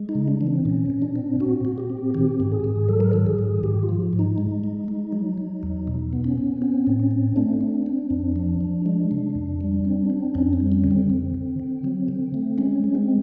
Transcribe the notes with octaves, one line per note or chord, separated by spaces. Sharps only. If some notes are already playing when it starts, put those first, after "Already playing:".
Already playing: G#3
D#4
C#3
D4
E3
C4
A#2 C#4
A#2
D4
C4
A#2 F#4
A#2
G4
C4
D#3 G4
G#2
G#4
G#2
F#3 A4
A#4
D#3 A4
G#4
G#2
G#2 G4
F4
F3
G#2
D#4
G#3
G#3
G#3
F#3
F#3
E2
B2
B3
C#4
B3
C4 C#4
A2
C#4
C4
A3 D4
C4
C4
F2
F3
F3
G#3 D4
C3
F2
G3
C4
C4
F2 C#4
C4
G3
C#4
D3
C4
F2
D3
D3
F#3
D3
A3
G#3 C#4
G#3
C4